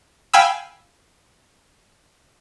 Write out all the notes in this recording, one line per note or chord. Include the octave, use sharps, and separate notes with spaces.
F5 G5 G#5 B5 E6